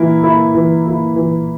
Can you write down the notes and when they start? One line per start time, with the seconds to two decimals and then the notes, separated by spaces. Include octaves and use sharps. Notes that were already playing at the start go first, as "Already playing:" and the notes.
Already playing: E3 A#3 E4
0.23 A#3 E4
0.54 E3
0.85 A#3 E4
1.16 E3